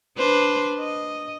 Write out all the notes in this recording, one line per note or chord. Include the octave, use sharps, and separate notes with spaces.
D4 B4 C5
D#5